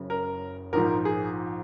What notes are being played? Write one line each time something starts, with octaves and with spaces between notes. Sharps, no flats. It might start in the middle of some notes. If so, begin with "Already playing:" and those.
Already playing: F#1 F#2 C#3 F#3
A#4
A#1 G#2 F3 A#4
G#4